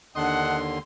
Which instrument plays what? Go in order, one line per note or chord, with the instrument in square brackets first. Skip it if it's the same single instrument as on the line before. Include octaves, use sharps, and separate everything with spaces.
[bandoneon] D#2 D3 C6 [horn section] D4 D#5 F#5